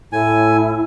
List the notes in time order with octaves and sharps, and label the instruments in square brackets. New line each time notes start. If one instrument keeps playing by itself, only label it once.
[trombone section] A2 [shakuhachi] E4 [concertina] G#5